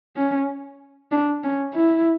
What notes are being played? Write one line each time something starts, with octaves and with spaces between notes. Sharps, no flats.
C#4
D4
C#4
E4